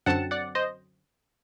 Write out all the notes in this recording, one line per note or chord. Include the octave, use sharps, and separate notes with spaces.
F#2 D3 F#3 C4 F#5 A5
D5 F#5
C5 D#5